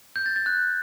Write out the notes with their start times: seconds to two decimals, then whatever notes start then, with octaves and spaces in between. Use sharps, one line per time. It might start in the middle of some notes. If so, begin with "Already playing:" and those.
0.16 G6
0.26 A6
0.36 A6
0.46 F#6